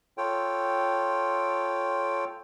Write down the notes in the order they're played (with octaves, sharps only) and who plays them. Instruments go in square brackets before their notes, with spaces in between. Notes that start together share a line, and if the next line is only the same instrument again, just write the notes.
[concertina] F4 A4 C#5 G5